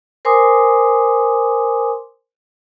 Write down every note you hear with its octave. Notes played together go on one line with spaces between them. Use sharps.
A#4 C5 G#5 C6 D6 D#6